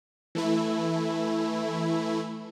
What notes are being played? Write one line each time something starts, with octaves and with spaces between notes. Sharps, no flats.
E3 A3 E4